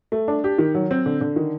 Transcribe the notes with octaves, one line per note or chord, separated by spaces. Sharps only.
A3
D4
G4
D#3
F#3
C4
D3
D3
D#3